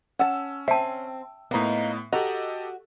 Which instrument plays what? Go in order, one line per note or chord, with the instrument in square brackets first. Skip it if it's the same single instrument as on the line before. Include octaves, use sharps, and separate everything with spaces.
[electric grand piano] C#4 E6 [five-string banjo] F#5 A5
[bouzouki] C4 [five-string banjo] E5 [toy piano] G5 A5
[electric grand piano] A2 B3 [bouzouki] A#3 D#4
[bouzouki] F#4 [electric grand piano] G4 A4 D#5 [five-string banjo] A#5